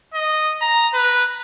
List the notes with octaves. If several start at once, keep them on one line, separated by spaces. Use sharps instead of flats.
D#5
A#5
B4